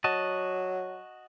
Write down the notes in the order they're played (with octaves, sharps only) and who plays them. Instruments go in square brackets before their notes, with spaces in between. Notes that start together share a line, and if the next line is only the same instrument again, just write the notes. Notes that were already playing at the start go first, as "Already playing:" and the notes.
[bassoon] F#3 [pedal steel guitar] F#4 D#5 A5